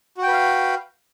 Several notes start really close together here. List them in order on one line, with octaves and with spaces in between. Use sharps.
F#4 G5 B4 F5